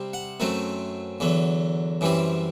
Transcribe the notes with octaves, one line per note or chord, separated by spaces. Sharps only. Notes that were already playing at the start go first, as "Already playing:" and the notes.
Already playing: C3 G3 C4
F#5
F#2 F#3 A3 C4
E2 D3 F#3
F#2 E3 G3 C4